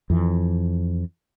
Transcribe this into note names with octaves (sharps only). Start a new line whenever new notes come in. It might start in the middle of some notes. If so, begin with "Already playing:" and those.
F2 E3